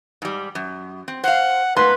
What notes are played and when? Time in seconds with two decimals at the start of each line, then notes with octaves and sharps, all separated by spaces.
0.22 G#2 G3
0.55 F#2
1.08 C4
1.24 C5 F5 F#5
1.77 G#2 A#3 B3 B4 C6